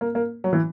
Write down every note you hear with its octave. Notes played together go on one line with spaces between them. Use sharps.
A#3
A#3
F#3
E3